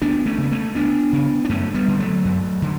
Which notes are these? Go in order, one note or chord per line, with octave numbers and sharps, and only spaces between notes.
D2 B3 D4
A3 C#4
C#3 B3
A3 C#4
D2 B3 D4
C#3
D4
F#2 A3 C#4
G3 B3
D3
F#3 A3
F#2
D3